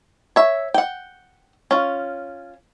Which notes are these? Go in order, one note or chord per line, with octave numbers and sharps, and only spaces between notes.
C#5 E5
F#5 G5
C#4 F4